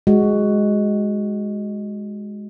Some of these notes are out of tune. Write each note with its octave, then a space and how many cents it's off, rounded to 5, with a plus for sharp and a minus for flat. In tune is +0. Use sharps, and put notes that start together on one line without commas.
G#3 +0 F#4 +10